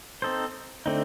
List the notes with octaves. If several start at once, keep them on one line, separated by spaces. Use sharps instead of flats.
C4 D#4 A4 C5
D3 A3 C4 D#4